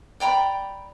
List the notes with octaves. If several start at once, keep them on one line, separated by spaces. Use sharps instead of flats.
D5 G5 A#5 B5